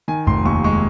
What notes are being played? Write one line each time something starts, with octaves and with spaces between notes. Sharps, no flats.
D#3 G#5
F1 C6
D#2 C#6
G#3 C#6